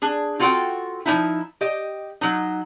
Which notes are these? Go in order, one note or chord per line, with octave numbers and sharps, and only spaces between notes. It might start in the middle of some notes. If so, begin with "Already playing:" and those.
D4 G#4
C4 F4 F#4 A4 F#5 G5
F3 G#3 D#4 E4
G4 D#5
F#3 D#4